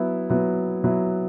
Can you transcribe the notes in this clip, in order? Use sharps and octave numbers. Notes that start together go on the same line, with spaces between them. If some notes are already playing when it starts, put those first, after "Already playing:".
Already playing: F#3 B3 E4
F#3 B3 E4
F#3 B3 E4